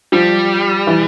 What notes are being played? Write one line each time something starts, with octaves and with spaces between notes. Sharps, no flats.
F3 G3
E3